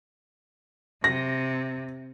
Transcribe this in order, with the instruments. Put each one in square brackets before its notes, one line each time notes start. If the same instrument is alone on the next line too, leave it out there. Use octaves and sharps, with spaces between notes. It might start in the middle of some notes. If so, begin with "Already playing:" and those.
[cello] C3 [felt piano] A#6